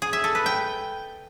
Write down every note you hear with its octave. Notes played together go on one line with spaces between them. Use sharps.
G#4
E5
A4
B4
G5